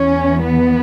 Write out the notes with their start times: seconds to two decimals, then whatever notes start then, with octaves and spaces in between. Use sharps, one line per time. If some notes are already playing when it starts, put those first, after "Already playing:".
Already playing: E2 E3 C#4
0.43 B3